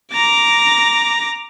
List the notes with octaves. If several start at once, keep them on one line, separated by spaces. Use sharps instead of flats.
A#5 D6